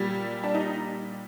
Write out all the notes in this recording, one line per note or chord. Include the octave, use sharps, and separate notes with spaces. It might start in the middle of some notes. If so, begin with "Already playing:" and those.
Already playing: A#2 G3
D4
D#4